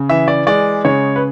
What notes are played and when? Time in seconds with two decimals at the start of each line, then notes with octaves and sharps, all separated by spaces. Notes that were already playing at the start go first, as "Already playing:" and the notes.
Already playing: C#3
0.09 E3 E5
0.28 D5
0.47 G#3 D5
0.85 C#3 C#5
1.16 B4